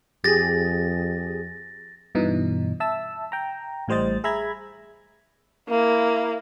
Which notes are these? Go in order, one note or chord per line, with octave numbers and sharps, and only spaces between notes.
F2 G4 G#4 A6 A#6
G2 B2 E3 D#4
E5 A5 E6
G5 A#5
A1 A2 G3 C5 D#5 A6
G#4 E5 A#5 B5 G#6
A#3 E4